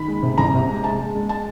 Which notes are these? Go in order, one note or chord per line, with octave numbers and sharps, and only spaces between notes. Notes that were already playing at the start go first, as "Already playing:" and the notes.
Already playing: D#3 B5
G#3
C3
C2 A#5
C3
G#3
G#3 A5
G#3
G#3
A5